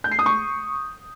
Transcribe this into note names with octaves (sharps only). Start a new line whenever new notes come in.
G6
C7
D#6
C#6